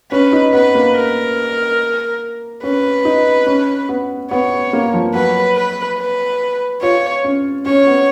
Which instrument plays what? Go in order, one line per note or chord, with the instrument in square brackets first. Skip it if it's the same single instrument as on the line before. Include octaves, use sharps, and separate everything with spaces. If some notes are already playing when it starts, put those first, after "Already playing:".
[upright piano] C#4 [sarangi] B4
[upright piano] D#4
[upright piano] B3 [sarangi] B4
[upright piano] A#3
[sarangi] A#4
[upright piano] C#4 [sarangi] B4
[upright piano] D#4
C#4
B3
[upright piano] B3 [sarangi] C#5
[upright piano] A#3
F3
[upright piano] F#3 [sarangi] B4
[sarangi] B4
B4
[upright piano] F4 [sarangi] C#5
[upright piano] C#4
[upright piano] C#4 [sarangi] C#5
[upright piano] B3